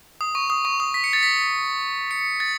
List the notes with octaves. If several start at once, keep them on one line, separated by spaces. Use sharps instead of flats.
D#6
C#6
D#6
C#6
D#6
B6
C#7
A6
B6
C#7
A6